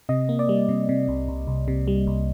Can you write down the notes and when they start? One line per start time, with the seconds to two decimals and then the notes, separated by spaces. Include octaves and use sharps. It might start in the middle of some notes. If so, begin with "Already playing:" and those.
0.09 C3 D#5
0.29 A#3
0.39 D5
0.49 G3
0.69 C3
0.89 C3
1.08 C2
1.28 C2
1.47 C2
1.68 C3
1.88 G3
2.07 C2